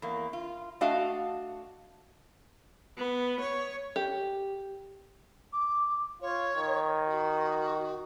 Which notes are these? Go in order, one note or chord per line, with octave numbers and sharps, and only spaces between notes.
E2 A#3
F4
A3 D4 F#4 D#5 F5 A5
B3
C#5
G4
D6
F4 C#5
D#3
F#4